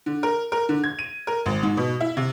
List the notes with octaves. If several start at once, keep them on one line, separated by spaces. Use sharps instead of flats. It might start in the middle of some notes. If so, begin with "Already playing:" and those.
D3
A#4
A#4
D3
G#6
D#7
A#4
G#1
G#2
B2
E4
C3